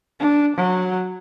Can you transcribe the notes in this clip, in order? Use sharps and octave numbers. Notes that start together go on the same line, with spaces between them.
D4
F#3